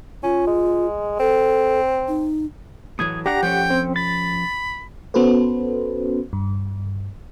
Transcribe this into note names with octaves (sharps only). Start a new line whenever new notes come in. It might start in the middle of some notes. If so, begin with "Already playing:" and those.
C#4 F4
G#3
C4 A4
D#4
A2 E3 F#3 D#6 G#6
D4 G4 F#5 A#5
F3 A3 C#4 G5
C4
B5 A6
B3 C#4 F#4 A4 B4 C5
G2